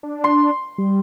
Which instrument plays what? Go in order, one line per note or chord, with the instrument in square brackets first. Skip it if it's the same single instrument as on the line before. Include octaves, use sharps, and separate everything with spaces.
[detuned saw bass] D4
[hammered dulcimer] C6
[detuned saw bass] G3